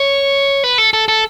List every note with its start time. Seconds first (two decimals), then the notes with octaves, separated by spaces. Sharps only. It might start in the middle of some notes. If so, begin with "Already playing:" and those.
Already playing: C#5
0.64 B4
0.78 A4
0.93 A4
1.08 A4